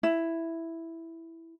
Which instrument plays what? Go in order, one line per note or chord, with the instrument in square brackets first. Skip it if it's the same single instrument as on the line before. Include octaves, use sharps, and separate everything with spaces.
[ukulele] E4